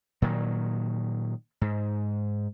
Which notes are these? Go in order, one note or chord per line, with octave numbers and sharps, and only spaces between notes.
A#2 D#3 F#3
G#2